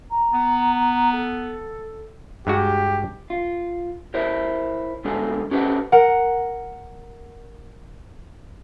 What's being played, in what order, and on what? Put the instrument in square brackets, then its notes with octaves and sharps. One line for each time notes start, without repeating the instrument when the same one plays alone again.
[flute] A#5
[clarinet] B3
[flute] A4
[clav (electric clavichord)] G2 G#3 F#4 [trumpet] G4
[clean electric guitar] F4
E4 A#4 C5 C#5
C2 D3 G#3 B3 A4 G#5
C#4 G4 A4 B4 C5 F#5
[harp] A#4 F#5